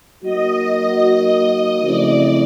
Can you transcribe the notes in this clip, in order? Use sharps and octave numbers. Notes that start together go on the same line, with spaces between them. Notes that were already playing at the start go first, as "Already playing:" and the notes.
F#3 A#3 D#4 F#4 D#5
C#3 F3 A3 C4 E4 D5